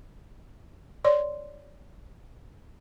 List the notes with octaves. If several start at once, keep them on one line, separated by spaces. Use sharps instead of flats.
C#5 D5 C6